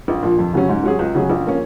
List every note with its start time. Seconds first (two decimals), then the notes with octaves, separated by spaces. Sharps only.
0.08 A#1
0.23 A#2 F3
0.38 F2
0.53 C#3 F#3 C#4
0.69 G#2
0.83 F#3 C#4 G#4
0.99 C#2
1.15 C#3 F#3 C#4 G#4
1.30 A#1
1.46 F3 A#3 C#4